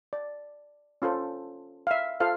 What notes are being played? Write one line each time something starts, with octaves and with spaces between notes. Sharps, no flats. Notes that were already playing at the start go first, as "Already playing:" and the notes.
D5
C#4 F4 A4 C5
F5
E5
F4 A4 C5 F5